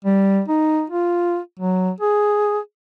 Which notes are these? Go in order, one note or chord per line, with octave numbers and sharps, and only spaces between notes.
G3
D#4
F4
F#3
G#4